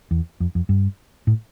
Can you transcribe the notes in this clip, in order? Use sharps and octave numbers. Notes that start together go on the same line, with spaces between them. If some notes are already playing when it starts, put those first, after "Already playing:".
E2
F2
F2
G2
A2